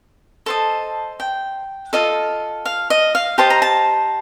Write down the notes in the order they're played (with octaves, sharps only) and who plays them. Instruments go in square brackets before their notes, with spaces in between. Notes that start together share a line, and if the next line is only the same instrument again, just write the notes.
[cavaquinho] A4 C5 D#5 A5
G5
F4 A4 D#5
F5
D#5
F5
G4 C5 D#5 A5
A#5
A5